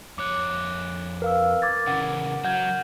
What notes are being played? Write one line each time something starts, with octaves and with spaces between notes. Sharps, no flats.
F2 C#5 D6 F#6
A#4 B4 F5 E6
D6 G#6 A6
C#3 E3 F#5
F#3 F#5 F6 G6 G#6